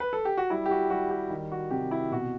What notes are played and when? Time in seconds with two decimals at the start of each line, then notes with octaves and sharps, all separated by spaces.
0.00 B4
0.13 A4
0.25 G4
0.37 F#4
0.50 G3 E4
0.66 G4
0.71 F#4
0.90 G3 F#4
1.11 G4
1.30 D#3
1.52 F#4
1.71 C3 G4
1.91 E4
2.11 B2 F#4